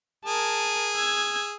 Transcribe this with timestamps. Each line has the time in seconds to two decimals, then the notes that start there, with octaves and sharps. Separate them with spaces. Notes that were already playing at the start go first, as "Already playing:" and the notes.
0.25 G#4 A#4 A5
0.95 E6 G#6